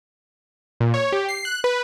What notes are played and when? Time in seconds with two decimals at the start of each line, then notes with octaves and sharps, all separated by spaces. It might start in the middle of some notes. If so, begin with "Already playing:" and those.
0.80 A#2
0.94 C#5
1.12 G4
1.29 C7
1.45 F#6
1.64 B4